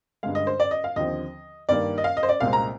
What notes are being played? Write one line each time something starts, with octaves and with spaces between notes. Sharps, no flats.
G2 D3 G#3 F5
D#5
C5
D5
D#5
F5
D#2 D3 F3 C4 D#5
G2 D#3 A#3 D5
D#5
F5
D#5
C5
D5
C2 A#2 G#3 C4 F5
A#5